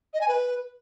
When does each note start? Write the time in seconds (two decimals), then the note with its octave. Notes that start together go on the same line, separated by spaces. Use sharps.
0.14 D#5
0.21 G#5
0.28 B4